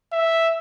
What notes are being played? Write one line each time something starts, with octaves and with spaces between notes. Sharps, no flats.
E5